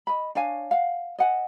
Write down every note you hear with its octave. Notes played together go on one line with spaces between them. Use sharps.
D#5 B5
D4 C#5 F5 G#5
F5 F#5
D#5 F#5 G#5